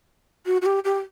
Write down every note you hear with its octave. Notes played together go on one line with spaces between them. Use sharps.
F#4
F#4
G4
G4